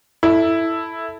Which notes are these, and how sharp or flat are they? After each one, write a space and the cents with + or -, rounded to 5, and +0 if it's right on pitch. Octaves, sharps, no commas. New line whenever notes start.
E4 +0 A4 +0